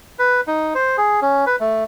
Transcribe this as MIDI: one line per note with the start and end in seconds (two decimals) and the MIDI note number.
0.19 0.41 71
0.47 0.74 63
0.75 0.97 72
0.98 1.20 68
1.22 1.45 61
1.46 1.56 71
1.60 1.84 57